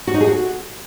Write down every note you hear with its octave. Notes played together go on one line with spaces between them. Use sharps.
F#4
D#4
G#4
F#4